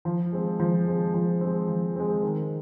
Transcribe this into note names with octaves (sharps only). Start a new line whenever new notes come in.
F3
G#3 C4
F3
G#3 C4
F3
G#3 C4
F3
G#3 C4
D#3